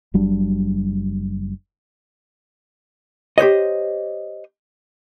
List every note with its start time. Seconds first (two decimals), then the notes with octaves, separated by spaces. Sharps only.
0.14 F#1 F#3 G3 D4
3.38 G4 C5 C#5 D#5